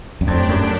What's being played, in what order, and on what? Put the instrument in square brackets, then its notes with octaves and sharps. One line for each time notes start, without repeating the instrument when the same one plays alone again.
[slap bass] F#2
[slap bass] F2 [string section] F#3 A3 D4 G4
[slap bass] F#2